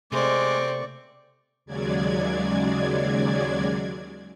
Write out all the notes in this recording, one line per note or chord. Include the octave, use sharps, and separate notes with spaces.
C3 G#3 A3 C4 D5 C#6
D#2 C#3 F#3 G#3 D5 G#6